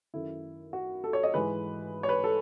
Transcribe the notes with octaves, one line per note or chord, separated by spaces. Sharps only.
F#2 D#3 A3 E4
F#4
A4
C#5
D#5
G#2 E3 G#3 B4
C#5
B4
A4